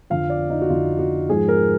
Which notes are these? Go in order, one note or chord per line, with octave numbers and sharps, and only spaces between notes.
F2 D3 F3 F5
D5
D#4
F#4
F2 D3 F3 F4
F#4
G#2 F3 G#4
A#4